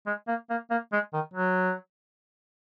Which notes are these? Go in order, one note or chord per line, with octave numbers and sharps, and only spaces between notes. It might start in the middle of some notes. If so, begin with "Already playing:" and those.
G#3
A#3
A#3
A#3
G#3
D#3
F#3